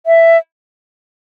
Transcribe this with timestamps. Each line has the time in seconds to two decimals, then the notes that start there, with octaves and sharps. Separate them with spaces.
0.06 E5